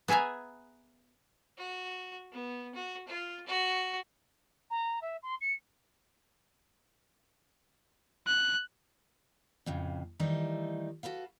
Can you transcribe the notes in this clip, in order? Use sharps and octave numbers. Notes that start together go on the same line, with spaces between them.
B3 G#4 E5 G#5 A#5
F#4
B3
F#4
F4
F#4
A#5
E5
C6
C#7
F#6
F2 A2 C#3
D#3 E3 G3 A3 D#4
F#4 A4 B4 F5